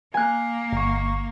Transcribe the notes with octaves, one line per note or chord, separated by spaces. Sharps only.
A#3 G#5 F#6
G1 C#6